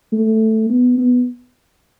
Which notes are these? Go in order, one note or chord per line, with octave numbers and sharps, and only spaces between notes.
A3
B3
B3